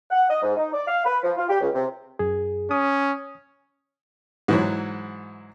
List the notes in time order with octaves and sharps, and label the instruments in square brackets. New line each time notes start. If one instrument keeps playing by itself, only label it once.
[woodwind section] F#5
D#5
G#2
D#4
D5
F5
B4
F3
F4
G4
C#2
C3
[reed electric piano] F#2 G#4
[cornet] C#4 [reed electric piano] D#6
[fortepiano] G#2 E3 F#3